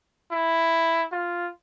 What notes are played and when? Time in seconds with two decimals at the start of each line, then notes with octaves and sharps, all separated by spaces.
0.31 E4
1.12 F4